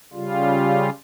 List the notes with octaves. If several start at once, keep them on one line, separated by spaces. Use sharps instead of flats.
C#3 G3 F4